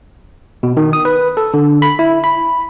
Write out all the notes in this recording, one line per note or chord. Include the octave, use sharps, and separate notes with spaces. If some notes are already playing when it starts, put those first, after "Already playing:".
B2
D#3
D#6
B4
A4
D3
B5
E4
B5